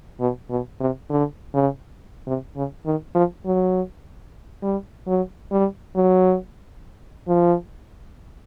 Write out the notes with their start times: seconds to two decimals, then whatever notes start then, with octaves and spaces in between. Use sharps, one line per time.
0.20 B2
0.50 B2
0.80 C3
1.10 D3
1.54 C#3
2.27 C3
2.56 C#3
2.86 D#3
3.15 F3
3.46 F#3
4.62 G3
5.07 F#3
5.52 G3
5.96 F#3
7.28 F3